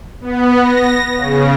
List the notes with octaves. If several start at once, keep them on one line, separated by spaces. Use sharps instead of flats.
B3
A#6
C#3